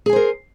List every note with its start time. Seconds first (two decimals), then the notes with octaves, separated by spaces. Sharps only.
0.06 G#4
0.09 G#5
0.13 C5
0.16 A#4